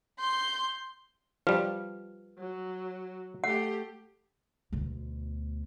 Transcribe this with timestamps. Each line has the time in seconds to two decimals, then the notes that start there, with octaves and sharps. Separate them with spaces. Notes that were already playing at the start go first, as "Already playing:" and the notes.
0.19 C6 G6
1.47 F3 G3 B4
2.38 F#3
3.44 A3 G4 F#5
4.72 D2 B2